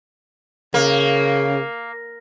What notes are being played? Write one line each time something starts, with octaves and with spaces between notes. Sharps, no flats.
C#3 A#3